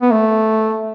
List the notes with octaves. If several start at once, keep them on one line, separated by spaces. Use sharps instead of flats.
B3
A3